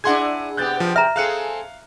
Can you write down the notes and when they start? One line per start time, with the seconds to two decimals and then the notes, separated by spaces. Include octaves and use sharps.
0.04 D4 E4 G#4 F#5 C6 G#6
0.57 C3 B3 G4 F#6 G6 A6
0.80 F3
0.96 E5 A#5 F6
1.16 C4 G#4 A4 F5 F#6 C#7